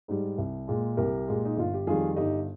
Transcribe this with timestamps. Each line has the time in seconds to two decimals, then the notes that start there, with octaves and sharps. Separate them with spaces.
0.08 G#2 G3
0.38 C2
0.68 A#2 G#3
0.97 C2 G4 A#4
1.28 A#2 G#3
1.45 D#4
1.57 G1 F4
1.74 G4
1.87 F2 D#3 G3 F4 G#4
2.16 G1 D#4 G4